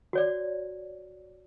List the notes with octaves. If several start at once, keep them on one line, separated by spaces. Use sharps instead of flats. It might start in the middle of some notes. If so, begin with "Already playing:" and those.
F#4 C#5 D5